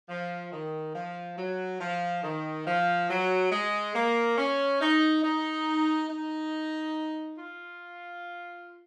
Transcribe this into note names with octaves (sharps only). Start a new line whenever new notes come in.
F3
D#3
F3
F#3
F3
D#3
F3
F#3
G#3
A#3
C#4
D#4
D#4
D#4
F4